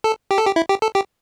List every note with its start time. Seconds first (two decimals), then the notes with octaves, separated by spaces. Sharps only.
0.04 A4
0.31 G4
0.38 A4
0.46 G4
0.56 E4
0.69 G4
0.82 A4
0.95 G4